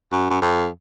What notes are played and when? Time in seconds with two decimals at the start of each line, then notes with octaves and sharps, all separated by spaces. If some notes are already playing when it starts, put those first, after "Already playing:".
0.12 F#2
0.30 F#2
0.42 F2